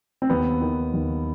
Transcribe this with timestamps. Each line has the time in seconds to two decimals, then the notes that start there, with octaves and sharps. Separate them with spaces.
0.22 C4
0.30 D#2 B3
0.61 D#3
0.93 D#2